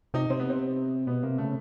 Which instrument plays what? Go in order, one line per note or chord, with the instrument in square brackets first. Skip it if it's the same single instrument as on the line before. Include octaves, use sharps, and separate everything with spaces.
[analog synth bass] C3 [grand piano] D#4
[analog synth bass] C3 [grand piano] C4
[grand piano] B3
C4
[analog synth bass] B2 [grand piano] B3
[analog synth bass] C3 [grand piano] A#3
[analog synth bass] C#3 [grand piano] A3